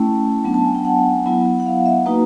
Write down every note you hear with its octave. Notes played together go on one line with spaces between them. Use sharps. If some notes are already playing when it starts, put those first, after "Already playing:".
Already playing: A3 C#4 E4 G5
F#3 B3 D4
A5
G#5
G5
F#5
F#3 B3 E4
F#5
F5
E5
A#3 D#4 F#4 B4